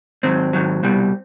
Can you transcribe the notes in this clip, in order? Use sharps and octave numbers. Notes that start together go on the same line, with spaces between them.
G#2 D#3 F#3 C4
G#2 D#3 F#3
C2 B2 G3